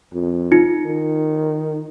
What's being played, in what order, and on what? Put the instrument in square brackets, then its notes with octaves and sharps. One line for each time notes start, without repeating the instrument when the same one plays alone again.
[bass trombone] F2
[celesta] D#4 F4 C#7
[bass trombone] D#3